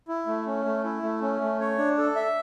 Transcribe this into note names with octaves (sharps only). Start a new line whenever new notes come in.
E4
A3
C#4
A3
E4
A3
C#4
A3
C#5
D4
A4
E5